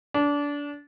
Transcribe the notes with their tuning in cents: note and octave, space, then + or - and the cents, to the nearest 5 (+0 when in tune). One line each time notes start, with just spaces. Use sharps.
D4 -25